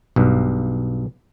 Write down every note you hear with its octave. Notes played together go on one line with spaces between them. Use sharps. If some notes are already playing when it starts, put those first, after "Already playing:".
B1 G2